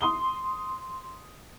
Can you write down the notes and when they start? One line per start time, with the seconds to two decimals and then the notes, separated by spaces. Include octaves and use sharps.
0.01 C6 D#6 G7